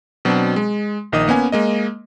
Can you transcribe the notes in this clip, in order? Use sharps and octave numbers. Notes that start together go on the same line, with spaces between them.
B2 F#3 C4 D4
G#3
A#1 D#3 D#5 D#6
A#3 B3 C#4 G#5
G#3 A#3 D#5